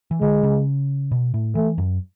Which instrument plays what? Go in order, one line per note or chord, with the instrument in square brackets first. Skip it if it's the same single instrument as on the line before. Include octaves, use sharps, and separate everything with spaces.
[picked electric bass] E3
[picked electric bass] D3 [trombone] G#3
[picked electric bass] C#3
B2
A2
[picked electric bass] E3 [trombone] A3
[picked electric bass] F#2